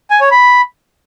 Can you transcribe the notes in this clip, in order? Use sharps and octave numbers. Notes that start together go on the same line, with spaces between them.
G#5
C#5
B5